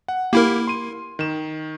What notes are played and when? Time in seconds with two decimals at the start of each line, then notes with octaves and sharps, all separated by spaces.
0.08 F#5
0.33 A#3 E4 G4 A#4
0.67 C6 D#7
1.19 D#3 E7